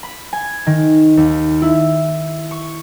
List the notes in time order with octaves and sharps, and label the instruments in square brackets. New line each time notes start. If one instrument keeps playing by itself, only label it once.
[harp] B5
G#5
D#3
D#2
E4
C#6